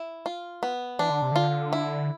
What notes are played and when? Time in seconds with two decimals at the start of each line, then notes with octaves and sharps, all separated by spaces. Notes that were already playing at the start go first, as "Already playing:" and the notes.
Already playing: E4
0.26 F4
0.63 B3
0.99 E3 D4
1.10 D3
1.22 C3
1.32 D3 F4
1.73 E4